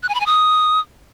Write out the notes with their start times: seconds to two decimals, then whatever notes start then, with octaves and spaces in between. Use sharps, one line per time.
0.03 F#6
0.09 G#5
0.14 B5
0.20 G#5
0.26 D#6